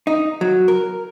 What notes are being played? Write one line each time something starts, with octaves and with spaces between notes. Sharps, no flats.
D#4
F#3
A#4